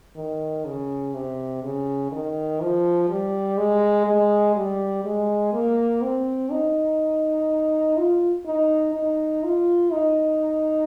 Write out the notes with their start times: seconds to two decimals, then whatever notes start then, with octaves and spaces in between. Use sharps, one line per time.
0.16 D#3
0.65 C#3
1.14 C3
1.63 C#3
2.12 D#3
2.61 F3
3.09 G3
3.58 G#3
4.07 G#3
4.56 G3
5.05 G#3
5.53 A#3
6.02 C4
6.51 D#4
7.97 F4
8.46 D#4
8.95 D#4
9.43 F4
9.92 D#4